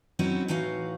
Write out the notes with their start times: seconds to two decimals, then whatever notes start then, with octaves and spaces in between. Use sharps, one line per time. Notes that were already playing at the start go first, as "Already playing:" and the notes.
0.19 F#3 C4 C#4 D#4 E4
0.48 A2 E3 D#4 F#4 F5